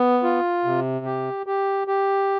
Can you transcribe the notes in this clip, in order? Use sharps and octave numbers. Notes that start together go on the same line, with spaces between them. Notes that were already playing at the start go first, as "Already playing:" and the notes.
Already playing: B3
F4
C3
G4
G4
G4